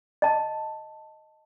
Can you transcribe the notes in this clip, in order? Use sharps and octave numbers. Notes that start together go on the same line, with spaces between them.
D#5 A5